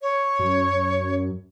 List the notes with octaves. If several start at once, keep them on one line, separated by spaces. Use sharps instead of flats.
C#5
F#2